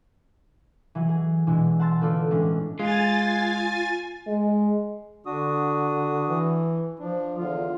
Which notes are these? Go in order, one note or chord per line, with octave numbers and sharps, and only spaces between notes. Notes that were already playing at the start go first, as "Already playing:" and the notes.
E3 F#3
G#4
B2 E3 G#3 D4 E4 F#4
F#5 A5 C6 E6 A6
D3 A3 B3 F4 A4 D5
A2 E3 G#3 C#4 D4 A4
G#3 F4 G#5 A6
G#3
D3 D4 F#4 D#6
E3
F3 D4
E2 D3 F4